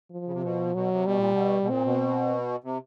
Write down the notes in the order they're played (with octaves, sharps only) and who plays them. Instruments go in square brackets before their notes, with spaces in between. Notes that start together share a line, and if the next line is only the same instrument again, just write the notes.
[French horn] F3
[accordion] C#3
C3
B2
[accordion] B2 [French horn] F#3
[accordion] C3
[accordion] B2 [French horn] G3
[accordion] A#2
B2
B2
[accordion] A#2 [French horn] C4
[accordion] B2
C3